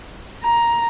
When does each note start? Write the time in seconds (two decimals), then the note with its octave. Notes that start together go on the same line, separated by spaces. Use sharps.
0.44 A#5